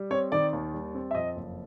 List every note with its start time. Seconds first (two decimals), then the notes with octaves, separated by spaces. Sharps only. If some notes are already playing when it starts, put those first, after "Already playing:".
Already playing: G3
0.11 C4 C#5
0.32 D#3 D5
0.53 D#2
0.74 G3
0.95 C4
1.11 E5
1.15 F2 D#5
1.36 F#1